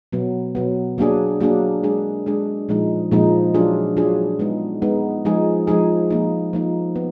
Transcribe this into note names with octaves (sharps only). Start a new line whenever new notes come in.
B2 F#3 B3
B2 F#3 B3
F#3 A#3 D4 G#4
F#3 A#3 D4 G#4
G#3 D4 G#4
G#3 D4 G#4
A#2 F3 G#3 D#4
A#2 F3 G#3 D#4
F#3 D4 F4 G#4
F#3 D4 F4 G#4
G#3 B3 D#4
G#3 B3 D#4
F3 G#3 D#4 G#4
F3 G#3 D#4 G#4
F3 A#3 D#4
F3 A#3 D#4
B3